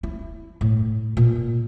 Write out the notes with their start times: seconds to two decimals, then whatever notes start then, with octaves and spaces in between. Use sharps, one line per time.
0.03 E4
0.61 A2
1.17 A#2